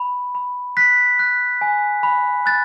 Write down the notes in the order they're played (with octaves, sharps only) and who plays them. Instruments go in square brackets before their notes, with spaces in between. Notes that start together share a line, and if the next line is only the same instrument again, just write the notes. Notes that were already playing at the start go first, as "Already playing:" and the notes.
Already playing: [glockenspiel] B5
B5
F#6 B6
F#6
G#5
B5
F#6 A6